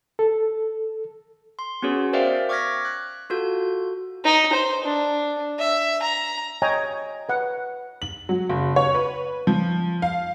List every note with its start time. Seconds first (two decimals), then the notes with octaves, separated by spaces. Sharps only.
0.19 A4
1.59 C6
1.82 B3 C#4 F#4 G#4 C#5
2.13 A#4 C5 D5 E5 F5 G5
2.49 C#6 D6 F6 G#6 A#6 B6
2.85 F#6
3.30 F4 F#4 A4 G6
4.24 D#4
4.53 C5
4.84 D4
5.59 E5
6.02 A#5
6.62 C#5 D#5 G5 G#5 A#5
7.29 B4 F#5
8.02 F#7
8.29 F#3
8.49 F#1
8.76 C#5
8.94 B4
9.47 F3
10.02 F5